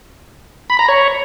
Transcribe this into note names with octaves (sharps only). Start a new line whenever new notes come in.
B5
A#5
C#5